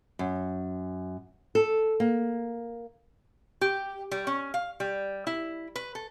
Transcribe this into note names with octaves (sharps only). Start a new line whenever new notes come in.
F#2
A4
A#3
G4
G3
C#4
F5
G3
E4
B4
A4